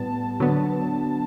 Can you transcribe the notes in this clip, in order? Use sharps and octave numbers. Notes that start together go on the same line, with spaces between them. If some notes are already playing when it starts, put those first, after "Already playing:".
Already playing: A2 G3 B3 A5
D3 F#3 B3